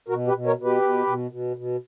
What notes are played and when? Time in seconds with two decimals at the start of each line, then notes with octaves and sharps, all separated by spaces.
0.08 B2 F#4 A#4
0.28 G4 B4
0.34 B2
0.46 A#4 C#5
0.58 B2
0.64 G4 B4
0.82 B2
1.07 B2
1.31 B2
1.57 B2